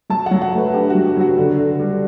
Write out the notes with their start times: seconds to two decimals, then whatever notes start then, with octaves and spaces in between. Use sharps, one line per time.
0.10 F#3 A5
0.26 F#3 F#5
0.42 F#5
0.53 A3
0.58 B4
0.74 D4 G4
0.90 F#3 F#4
1.05 G4
1.17 F#3 F#4
1.38 D3
1.59 D3
1.80 G3